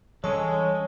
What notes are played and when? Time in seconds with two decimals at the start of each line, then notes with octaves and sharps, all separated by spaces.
0.24 E3 G3 G#3 C#4 G#4 A4 C#5